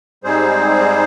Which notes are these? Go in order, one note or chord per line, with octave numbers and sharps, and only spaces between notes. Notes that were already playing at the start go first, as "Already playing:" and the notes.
G#2 G3 C4 D#4 G#4 C5